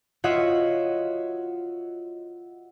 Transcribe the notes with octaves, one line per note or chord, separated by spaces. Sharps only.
F4 F#4 C#5 D#5 E5 F#5